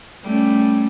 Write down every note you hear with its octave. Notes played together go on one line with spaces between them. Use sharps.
G3 A3 C#4